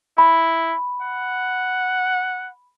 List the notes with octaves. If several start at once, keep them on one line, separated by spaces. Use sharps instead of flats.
E4 B5
F#5